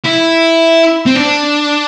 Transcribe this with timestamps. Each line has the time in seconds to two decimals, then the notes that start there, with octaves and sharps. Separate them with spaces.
0.04 E4
1.06 C4
1.16 D4